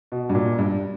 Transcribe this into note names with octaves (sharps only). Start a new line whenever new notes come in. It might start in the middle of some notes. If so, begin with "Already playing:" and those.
B2
G2
A#2
G2